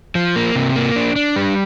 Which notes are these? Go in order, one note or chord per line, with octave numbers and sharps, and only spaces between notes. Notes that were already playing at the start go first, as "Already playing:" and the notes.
F3
A#3
C3
A#3
D4
D4
G3